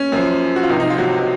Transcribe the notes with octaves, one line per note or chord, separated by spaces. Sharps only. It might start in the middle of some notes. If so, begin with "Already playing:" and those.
Already playing: C#4
F#2 F3
F#4
F4
C#2 C3 F3 D#4
D#4
F4
F#3 F#4